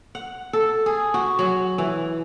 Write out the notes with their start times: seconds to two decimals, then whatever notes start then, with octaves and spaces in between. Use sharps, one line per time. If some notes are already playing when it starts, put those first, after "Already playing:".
0.15 F#5
0.53 A4
0.86 G#4
1.14 F#4
1.39 F#3
1.78 E3